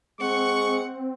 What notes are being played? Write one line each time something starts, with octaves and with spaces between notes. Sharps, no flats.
G#3 C4 F#5 C#6 C#7